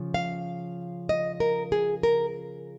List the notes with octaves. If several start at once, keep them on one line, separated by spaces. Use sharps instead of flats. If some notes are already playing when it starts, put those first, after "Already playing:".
Already playing: C#3 F3
F5
D#5
A#4
G#4
A#4